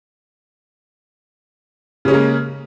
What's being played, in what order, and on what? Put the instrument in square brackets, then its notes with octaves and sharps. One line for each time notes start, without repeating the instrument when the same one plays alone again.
[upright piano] C#3
C#4
G#3
A#3